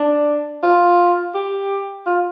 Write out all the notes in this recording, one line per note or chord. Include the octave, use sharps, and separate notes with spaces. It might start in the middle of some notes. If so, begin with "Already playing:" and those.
Already playing: D4
F4
G4
F4